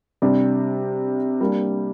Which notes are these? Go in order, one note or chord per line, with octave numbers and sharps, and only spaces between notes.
C3 G3 D4 G4
G3 A#3 D4